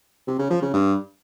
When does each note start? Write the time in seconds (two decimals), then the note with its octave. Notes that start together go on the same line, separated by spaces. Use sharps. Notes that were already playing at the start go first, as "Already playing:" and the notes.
0.27 C3
0.39 C#3
0.50 F3
0.62 C#3
0.74 G2